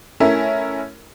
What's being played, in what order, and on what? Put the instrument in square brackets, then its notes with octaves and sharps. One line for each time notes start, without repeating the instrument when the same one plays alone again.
[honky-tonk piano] A3 C#4 E4 A#4